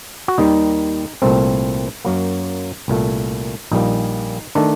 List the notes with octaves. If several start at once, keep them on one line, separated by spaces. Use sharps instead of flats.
F#4
D#2 D#3 G3 D#4
C2 A#2 A3 C4
F#2 F#3 A#3
C2 A#2 A3
A#1 A#2 G3 A#3 D#4
D#3 A3 D4